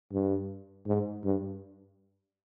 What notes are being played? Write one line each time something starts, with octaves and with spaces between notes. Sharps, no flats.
G2
G#2
G2